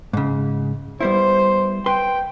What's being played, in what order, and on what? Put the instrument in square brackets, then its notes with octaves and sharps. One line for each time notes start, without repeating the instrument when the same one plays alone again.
[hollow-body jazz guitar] G#2 C#3
[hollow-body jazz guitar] G3 B3 E4 [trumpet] C5
[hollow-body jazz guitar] B4 C6 [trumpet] G5